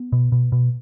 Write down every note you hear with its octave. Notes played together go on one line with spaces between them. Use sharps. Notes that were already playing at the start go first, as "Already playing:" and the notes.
Already playing: B3
B2
B2
B2